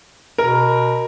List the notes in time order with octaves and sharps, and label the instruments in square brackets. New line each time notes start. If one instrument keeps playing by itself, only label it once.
[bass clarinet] B2 [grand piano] A#4